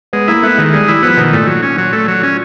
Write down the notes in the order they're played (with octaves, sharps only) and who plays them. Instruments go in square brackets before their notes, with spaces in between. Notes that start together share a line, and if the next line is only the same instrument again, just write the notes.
[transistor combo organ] G#3 [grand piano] B3
[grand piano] A#3 [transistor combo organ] E4
[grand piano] A3 [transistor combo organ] B3
[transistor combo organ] D#3 [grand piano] G#3
[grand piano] G3 [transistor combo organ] G#3
[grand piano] G3 [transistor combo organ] E4
[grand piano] F3 [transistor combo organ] B3
[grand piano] B2 [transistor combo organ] D#3
[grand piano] A#2 [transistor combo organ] A3
[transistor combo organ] F#3
C#4
F#3
A3
F#3
C#4